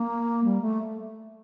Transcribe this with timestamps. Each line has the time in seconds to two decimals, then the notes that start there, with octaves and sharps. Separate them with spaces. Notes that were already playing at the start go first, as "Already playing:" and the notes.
Already playing: A#3
0.44 G3
0.61 A3